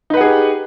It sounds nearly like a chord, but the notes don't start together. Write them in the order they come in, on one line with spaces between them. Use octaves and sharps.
D#4 B4 F#5 G#4 G4